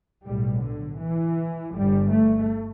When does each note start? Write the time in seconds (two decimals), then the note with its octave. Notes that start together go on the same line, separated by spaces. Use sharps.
0.25 B1 A2 G3
0.62 D3
0.99 E3
1.74 G1 G2 G3
2.12 A3